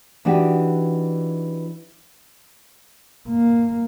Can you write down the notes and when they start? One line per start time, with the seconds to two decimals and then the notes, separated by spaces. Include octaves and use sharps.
0.25 E3 D4 D#4 F#4 G4
3.29 A#3